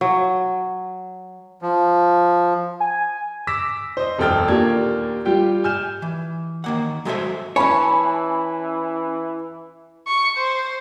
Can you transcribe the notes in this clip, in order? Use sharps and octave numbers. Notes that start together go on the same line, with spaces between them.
F#3
F3
G#5
D6 E6 A#6 B6 E7
C5 D#5
E1 F#2 A4 G5 F6 A6
D#2 A#2 A#3 D4 G4 G#6
G3 F4 G4 G5
G#5 F6 G6 E7
E3
D#3 A#3 F#5
F#3 G#3 A4 B4 C5 E5
E3 C#4 C#5 G#5 A5 B5
C#6
C5